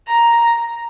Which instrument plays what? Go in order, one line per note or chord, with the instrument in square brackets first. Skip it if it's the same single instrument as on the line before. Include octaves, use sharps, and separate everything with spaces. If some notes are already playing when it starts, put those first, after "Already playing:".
[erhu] A#5